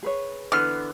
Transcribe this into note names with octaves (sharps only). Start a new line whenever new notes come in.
G#4 B4 C#5
D3 E3 B3 F6